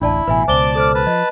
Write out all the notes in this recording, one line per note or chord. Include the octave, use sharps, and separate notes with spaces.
D1 A1 D4 E4 D5 A5
A1 B2 B4 E5 G#5
C#2 B2 C5 D5 A5 D6 G7
A4 C5 F6
B4 A5
F3 D#5